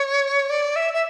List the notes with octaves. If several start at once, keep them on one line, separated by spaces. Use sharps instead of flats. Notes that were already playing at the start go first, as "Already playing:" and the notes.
Already playing: C#5
D5
E5
E5